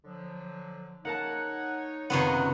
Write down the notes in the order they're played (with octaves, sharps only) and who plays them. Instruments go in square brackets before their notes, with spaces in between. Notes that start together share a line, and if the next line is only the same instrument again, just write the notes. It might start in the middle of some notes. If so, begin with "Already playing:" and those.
[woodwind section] D3 F3 F#3
[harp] A#3 A#4 A5 [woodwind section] D#4 C#5 [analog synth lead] F#5
[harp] F#1 F4 C#6 [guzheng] C3 D#3 B3 [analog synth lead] F#5